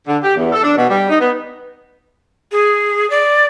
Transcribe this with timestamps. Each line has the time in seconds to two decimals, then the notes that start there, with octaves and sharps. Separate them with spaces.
0.07 D3
0.23 G4
0.36 E2
0.52 A4
0.63 D4
0.77 B2
0.89 G3
1.09 D#4
1.20 B3
2.52 G#4
3.10 D5